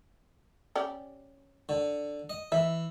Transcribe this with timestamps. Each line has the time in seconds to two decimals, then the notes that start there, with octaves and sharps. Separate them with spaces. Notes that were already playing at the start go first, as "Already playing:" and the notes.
0.76 C#4 G4 D5
1.69 D3
2.30 D#5
2.52 E3 E5